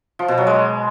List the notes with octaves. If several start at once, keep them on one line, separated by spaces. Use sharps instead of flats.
F3
B2
F#3
G#3